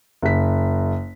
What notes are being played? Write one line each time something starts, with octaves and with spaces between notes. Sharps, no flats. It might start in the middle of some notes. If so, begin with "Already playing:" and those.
F#1 B6